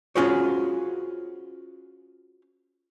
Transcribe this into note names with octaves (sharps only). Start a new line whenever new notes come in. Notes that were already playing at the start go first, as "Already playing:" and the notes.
C#4 F4 F#4 G#4 C5 C#5